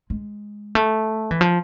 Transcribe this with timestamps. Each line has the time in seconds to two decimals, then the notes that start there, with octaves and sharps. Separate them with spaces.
0.10 G#3
0.75 A3
1.31 E3
1.41 F3